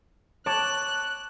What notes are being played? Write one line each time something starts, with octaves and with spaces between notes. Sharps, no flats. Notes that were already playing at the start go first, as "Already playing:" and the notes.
C#5 A5 D6 F#6